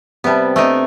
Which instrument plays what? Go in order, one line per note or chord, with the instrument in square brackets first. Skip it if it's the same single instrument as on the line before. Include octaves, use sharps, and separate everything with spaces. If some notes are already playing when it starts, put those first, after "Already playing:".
[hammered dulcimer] C3 A5 [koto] G3 B3
[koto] A3 D4 D#4